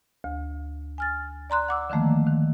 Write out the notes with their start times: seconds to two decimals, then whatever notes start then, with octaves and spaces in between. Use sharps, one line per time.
0.24 D2
0.98 G#5 F6 A6
1.50 D5 A#5 C6 F#6
1.69 F#5 D6 E6
1.90 D3 D#3 F3 A3 A#3
2.27 D#3